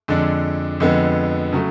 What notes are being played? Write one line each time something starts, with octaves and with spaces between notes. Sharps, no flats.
F2 D3 G#3 D4
F2 D3 G#3 B3
C#3 F#3 A3